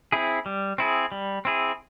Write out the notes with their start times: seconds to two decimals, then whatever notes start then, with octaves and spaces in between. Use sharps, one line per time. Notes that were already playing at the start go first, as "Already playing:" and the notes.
0.12 C4 E4 G#4
0.46 G3
0.78 C4 E4 G#4
1.12 G3
1.45 C4 E4 G#4